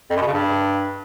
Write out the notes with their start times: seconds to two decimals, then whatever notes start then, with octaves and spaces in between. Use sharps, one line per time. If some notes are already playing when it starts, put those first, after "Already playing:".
0.10 F2
0.16 F#2
0.21 B2
0.27 C#3
0.33 G2